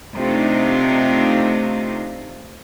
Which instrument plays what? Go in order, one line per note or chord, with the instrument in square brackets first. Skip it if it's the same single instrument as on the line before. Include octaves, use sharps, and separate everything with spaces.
[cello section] C3 A3 D4 D#4 F4